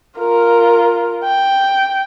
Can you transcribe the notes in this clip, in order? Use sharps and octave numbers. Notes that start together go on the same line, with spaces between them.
F4 A#4
G5